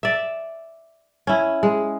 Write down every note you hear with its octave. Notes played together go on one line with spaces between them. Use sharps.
D5 E5
C#4 E4
G#3